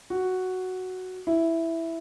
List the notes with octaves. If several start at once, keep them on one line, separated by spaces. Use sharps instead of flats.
F#4
E4